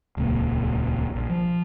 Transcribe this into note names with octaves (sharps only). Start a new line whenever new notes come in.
D#1 C#2 A#2
A#1
F3